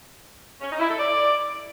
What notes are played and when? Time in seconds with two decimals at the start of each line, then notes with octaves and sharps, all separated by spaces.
0.61 C#4
0.70 D#4
0.79 E4
0.89 A4
0.98 D5